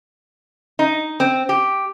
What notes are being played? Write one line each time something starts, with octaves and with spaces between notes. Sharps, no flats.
D#4
C4
G4